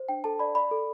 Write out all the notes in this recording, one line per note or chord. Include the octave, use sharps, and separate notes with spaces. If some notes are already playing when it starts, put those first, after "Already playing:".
Already playing: C5
D4 G5
A4 A5
D5 B5
D5 B5
A4